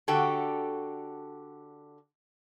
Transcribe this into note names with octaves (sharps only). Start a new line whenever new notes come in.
D3 F#4 G4 A4